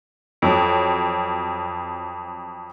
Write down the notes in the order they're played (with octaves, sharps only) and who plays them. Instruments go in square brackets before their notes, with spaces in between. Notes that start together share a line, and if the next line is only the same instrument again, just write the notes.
[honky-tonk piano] F2 F#3